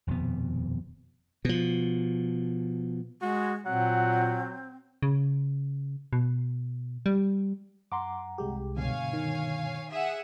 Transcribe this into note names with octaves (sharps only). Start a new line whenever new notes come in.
D#1 F2 B2 B3
B2 F3
G#3 F#4
A#2 F#3 C4 F#5
C#3
B2
G3
F#2 F#5 A#5 C6 D6
C2 G#3 G4
G2 B2 D3 C#5 F5 G#5
D#3
G#4 E5 F#5